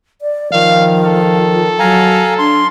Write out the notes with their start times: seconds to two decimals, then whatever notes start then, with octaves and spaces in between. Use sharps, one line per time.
0.22 D5
0.53 D#3 F3 F5
1.06 A4
1.79 F#3 F5 G#5 A#5
2.39 D4 C6